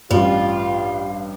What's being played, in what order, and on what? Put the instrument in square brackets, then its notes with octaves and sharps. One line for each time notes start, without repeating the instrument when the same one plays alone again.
[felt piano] A1 G2 [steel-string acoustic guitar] G3 [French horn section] F4 [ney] F5